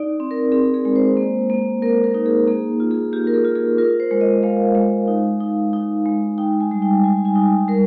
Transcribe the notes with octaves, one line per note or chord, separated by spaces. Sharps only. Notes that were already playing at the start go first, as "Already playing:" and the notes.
Already playing: D#4 D5
C4
A#4
C4 G#4
G#4
G#3
C5
A#3
A#3
A#3 A#4
A#4
D#4
G#4
A#3 G#4
F4
G#4
F4 G4
A#4
G#4
F4
G#4
F4 A#4
C5
G#3
D#5
G#3 F5
G#3
D#4
D#4
D#4
G#3
D#4 G5
G#5
G3
G5
G3 G#5
G#5
D#4
G5
G3 A#4